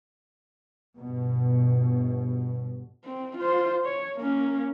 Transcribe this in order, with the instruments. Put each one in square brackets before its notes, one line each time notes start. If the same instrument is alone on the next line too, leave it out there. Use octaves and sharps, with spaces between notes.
[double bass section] G1 B2
[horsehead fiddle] C4
F4 C5
C#5
A#3 C#4